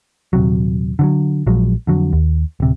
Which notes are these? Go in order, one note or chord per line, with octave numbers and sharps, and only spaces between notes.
D#1 G#1 C3 F#3
D3 E3 F#3
A#1 F3 F#3 G#3
F2 D3 F#3
D#2
D1 C3